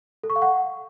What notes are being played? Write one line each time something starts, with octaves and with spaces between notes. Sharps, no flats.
A4
C#6
F5
F#5